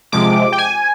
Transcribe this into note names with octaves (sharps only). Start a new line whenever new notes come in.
C3 F3 G#3 D6
G5
G#5